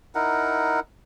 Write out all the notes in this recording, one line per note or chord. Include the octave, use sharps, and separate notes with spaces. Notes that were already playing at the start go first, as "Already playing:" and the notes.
D#4 E4 A#4 F#5